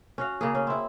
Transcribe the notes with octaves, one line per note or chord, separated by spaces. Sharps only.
C#4 F#4 F5
C#3 A#3 G#4
C#4
C4 E4